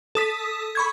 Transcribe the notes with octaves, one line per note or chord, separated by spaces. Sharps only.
A4 D#6 B6
B5 C#6 G#6